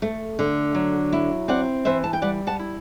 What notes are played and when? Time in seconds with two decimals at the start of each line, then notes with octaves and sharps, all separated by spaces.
0.02 A3
0.39 D3
0.75 F#3
1.13 E4
1.48 C4 D5 F#5
1.85 E3 C5 E5
2.04 A5
2.13 G5
2.22 G3 D5 F#5
2.47 F#5 A5
2.59 E4